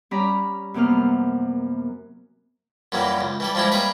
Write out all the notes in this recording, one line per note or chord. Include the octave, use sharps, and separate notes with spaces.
G3 C#4 D5 A#5 B5
F#2 C3 A#3 B3 F6
F#2 A#2 E3 F#3 G3
C#2
E3 G3 A4
F3 G3 G#3 D4 E4
G3 A#3 G#4 B4 C#5